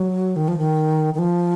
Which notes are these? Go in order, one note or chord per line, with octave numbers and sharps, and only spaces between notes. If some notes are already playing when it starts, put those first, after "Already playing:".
Already playing: F#3
D#3
F3
D#3
D#3
F3